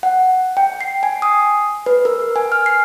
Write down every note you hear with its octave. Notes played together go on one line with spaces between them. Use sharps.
F#5
G5
C7
G#5
D#6
B4
A#4
G#5
F6
C7